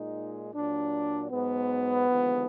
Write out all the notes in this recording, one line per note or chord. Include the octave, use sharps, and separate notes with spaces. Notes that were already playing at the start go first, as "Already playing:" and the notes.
Already playing: A#2 G#3 D#4
A#2 F#3 D4
G#2 F#3 B3
D#2 D3 F3 G#3